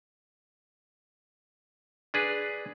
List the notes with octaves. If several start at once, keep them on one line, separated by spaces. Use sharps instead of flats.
D4 G#4 B4